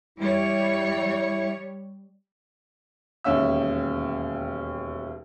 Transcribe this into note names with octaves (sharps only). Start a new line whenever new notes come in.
G3 E4 C#5
E1 D#2 C#4 E5 E6